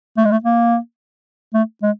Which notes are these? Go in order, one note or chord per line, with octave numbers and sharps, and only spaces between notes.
A3
G#3
A3
A#3
A3
G#3